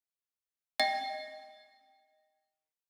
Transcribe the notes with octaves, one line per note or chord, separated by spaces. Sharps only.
D#5 G5 A#6